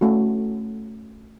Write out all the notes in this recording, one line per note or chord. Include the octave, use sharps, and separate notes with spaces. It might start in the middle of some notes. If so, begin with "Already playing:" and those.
A3 C#4 F#4